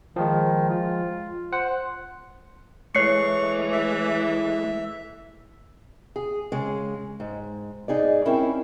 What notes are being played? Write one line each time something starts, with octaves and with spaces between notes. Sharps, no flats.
D#3 F3 G#3
F4
C5 F#5
E3 G#3 A3 C#5 C#6 C7 C#7
E5
G#4
C#3 G#3
G#2
G#2 D#4 G#4 D5
C4 C#4 E4 A#4